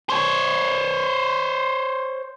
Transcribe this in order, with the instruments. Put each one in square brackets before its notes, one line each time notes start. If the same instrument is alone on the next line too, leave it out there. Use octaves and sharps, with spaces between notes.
[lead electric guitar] C5 C#5